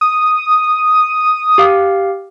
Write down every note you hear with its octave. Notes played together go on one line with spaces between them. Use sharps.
D#6
G4 F5